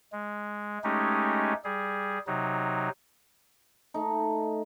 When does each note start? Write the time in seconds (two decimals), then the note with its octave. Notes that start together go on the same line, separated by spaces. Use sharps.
0.13 G#3
0.84 G#3 A3 C#4 D#4 G4
1.64 G3 G#4
2.27 C3 F#3 D#4
3.94 A3 D#4